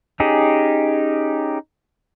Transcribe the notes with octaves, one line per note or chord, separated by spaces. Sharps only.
C#4 D#4 G4 G#4